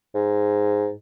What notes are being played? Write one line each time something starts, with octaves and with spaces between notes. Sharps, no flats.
G#2